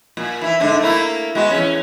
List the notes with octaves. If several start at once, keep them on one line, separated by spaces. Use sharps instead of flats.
A#2
E3 E4
G#2 D3 D4
A3 A#3 E4
G#3 B3 F#4
E2 C#4